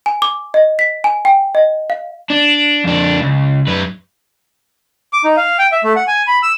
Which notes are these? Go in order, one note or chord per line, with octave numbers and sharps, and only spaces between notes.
G#5
D6
D#5
B6
G#5
G5
D#5
F5
D4
F2 D4
C#2
F#2 B4
D6
D#4
F5
G5
E5
A3
F#5
G#5
B5
E6